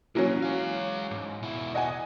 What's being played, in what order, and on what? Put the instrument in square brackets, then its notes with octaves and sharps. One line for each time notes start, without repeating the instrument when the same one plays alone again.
[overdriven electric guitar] B1 A#3 [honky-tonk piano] E3 F#3 C#4
[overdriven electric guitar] G#3 F5
G#2
B2 E4
[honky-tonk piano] D#5 F#5 G#5